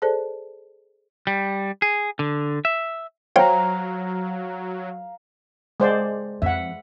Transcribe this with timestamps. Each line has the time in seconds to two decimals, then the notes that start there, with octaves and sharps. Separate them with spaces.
0.02 G#4 A4 C5 D5 A5
1.27 G3
1.82 G#4
2.19 D3
2.65 E5
3.36 F#3 C5 C#5 F5 G5 A#5
5.80 G#3 C5 D5
6.42 F2 E5 F#5